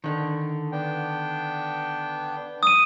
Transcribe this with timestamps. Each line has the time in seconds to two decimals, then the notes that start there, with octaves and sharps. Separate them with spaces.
0.04 D3 D#3
0.72 B3 D4 G5
2.63 D#6 D#7